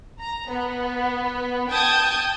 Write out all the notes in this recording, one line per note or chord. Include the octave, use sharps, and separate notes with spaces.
A#5
B3
G5 A5 D#6 G6 G#6